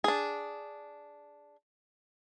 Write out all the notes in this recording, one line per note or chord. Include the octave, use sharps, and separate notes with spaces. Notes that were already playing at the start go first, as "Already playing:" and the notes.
D4 G#4